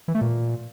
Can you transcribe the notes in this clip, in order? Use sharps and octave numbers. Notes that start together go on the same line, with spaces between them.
E3
A3
A#2